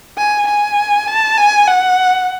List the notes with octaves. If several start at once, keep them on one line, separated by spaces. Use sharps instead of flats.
G#5
G#5
A5
G#5
F#5